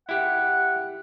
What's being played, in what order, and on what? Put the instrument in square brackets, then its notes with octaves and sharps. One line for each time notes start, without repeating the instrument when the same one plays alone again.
[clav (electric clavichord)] E4 G4 [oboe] F#5